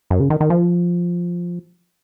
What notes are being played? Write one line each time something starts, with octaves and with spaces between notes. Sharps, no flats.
F#2
C#3
D#3
D#3
F3